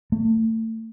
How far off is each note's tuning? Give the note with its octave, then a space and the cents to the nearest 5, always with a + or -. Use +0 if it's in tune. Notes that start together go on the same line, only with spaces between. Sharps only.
A3 +30